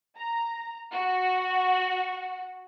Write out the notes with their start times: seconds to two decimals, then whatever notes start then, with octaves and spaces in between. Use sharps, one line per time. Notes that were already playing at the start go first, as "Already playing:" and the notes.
0.16 A#5
0.92 F#4